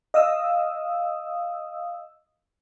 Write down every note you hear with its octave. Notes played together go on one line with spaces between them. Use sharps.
D#5 F5 D#6 E6